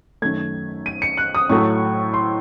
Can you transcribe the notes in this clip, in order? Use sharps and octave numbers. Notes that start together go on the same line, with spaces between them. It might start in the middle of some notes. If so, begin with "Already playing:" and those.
F#2 D#3 A3 G#6
D#7
C#7
F#6
D#6
A2 F#3 A3 C#6
C6